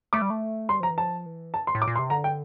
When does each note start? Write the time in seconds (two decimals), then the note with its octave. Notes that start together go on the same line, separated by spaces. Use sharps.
0.13 A3 D6
0.22 G3
0.30 A3
0.69 G3 C6
0.80 F3 A#5
0.90 E3
0.98 F3 A5
1.26 E3
1.54 A5
1.67 C6
1.75 A2
1.82 D6
1.87 A#2
1.96 C6
1.99 C3
2.10 D3 A#5
2.24 G5